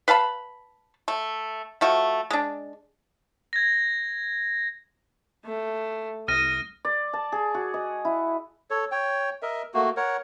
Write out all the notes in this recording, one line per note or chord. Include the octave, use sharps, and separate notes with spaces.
B4 F5 A5 B5
A3
F3 A3 F#4
G#3 D4
G#6 A#6
A3
C2 D#6 F6 A#6 D#7
D5
A5
G#4
F#4
D#5
E4
A4 C#5
C#5 G5
A#4 D#5 E5
A3 A#3 F#4
A#4 C#5 F#5